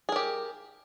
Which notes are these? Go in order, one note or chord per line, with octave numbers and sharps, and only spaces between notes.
G4 G#4 A#4